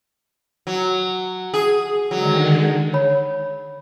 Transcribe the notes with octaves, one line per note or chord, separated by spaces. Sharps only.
F#3
G#4
D3 D#3 F#3 G#3
C#5 B5